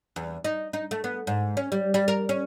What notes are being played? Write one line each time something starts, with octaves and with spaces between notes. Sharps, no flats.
E2
D#4
D#4
A3
B3
G#2
C#4
G3
G3
A#4
C#4